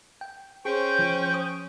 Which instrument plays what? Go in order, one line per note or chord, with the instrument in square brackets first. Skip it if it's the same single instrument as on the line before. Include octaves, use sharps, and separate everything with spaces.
[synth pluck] G5
[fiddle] C#4 [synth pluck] G#4 [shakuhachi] C5 [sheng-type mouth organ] G5 C#6
[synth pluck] F3
D#6